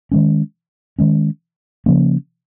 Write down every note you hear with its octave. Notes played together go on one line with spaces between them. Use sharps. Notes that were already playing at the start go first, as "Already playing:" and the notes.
D#3 G#3 C#4
D#3 G#3 C#4
C#3 F3 A#3 C#4